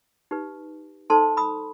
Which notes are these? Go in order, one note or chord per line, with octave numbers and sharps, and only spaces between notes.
D#4 G4 B4
D#4 A4 C5 A5 C6
B5 D#6